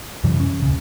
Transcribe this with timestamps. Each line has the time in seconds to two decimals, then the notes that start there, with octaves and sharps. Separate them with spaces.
0.24 F#2 C3 E3 G3
0.40 C#4
0.62 D#1 C2 C#3